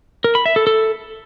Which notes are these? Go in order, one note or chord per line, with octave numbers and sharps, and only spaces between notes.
A#4
B5
E5
A4
A4